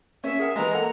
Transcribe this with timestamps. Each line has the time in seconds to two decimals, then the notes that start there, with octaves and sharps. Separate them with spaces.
0.24 C#4 E5
0.39 G#4 A#4 F#5
0.56 E3 G#3 A#5
0.72 A#3 A4 F#5